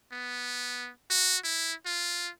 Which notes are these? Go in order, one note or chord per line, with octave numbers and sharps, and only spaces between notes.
B3
F#4
E4
F4